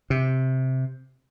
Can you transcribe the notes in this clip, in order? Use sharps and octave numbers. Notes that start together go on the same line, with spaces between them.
C3